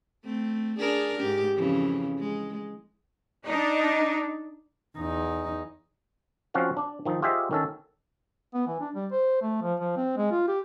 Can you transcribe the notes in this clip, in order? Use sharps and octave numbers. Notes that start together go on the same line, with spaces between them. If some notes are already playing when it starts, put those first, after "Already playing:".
A3 C4
D4 G#4 A#4
G#2 G4
F2 C#3 E3
G#3
D4 D#4
E2 D#4
F3 C4 C#4 F#4 F5 A5
D4 D5
D#3 F3 D#4
F4 G4 G#4 C5 D#5 E5
D#3 C#4 A4
B3
E3
D4
G3
C5
A3
F3
F3
C4
G#3
F4
G4